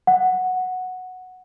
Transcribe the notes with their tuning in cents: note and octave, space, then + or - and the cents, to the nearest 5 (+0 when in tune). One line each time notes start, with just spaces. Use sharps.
F#5 -5